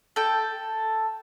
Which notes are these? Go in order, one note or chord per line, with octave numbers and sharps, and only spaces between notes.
A4 G5